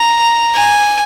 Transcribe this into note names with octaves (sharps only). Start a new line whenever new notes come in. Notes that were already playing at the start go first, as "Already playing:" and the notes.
Already playing: A#5
G#5